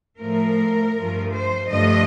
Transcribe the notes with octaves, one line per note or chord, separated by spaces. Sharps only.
A2 F3 A3 A#4
G2 F3 A3
C5
G2 D3 F3 A3 D#5